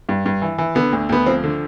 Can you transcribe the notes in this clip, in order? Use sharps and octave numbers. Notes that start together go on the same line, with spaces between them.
G2
G2
E3
E3
D3 B3
D2
D2 B3
F3 C4
D3